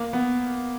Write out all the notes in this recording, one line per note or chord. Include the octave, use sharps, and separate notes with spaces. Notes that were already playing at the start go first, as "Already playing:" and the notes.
Already playing: A#3
B3